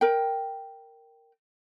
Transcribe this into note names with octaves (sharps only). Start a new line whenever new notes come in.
A#4 G5